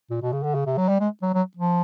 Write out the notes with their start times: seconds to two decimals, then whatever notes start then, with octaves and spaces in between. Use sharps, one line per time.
0.10 A#2
0.22 B2
0.32 C#3
0.43 D3
0.54 C#3
0.66 C3
0.77 F#3
0.88 G3
1.00 G#3
1.22 F#3
1.34 F#3
1.57 F3